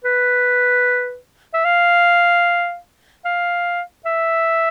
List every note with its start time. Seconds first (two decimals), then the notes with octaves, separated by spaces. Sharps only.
0.05 B4
1.54 E5
1.65 F5
3.25 F5
4.06 E5